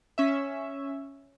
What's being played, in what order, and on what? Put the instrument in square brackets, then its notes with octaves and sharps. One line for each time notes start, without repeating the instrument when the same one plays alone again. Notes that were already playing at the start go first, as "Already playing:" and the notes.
[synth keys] C#4 E5